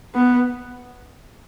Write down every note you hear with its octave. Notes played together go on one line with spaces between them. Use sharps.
B3